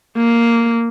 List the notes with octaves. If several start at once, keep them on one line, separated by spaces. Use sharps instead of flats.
A#3